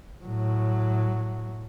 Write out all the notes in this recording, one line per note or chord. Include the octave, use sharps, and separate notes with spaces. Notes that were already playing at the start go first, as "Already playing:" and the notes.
A2 F#3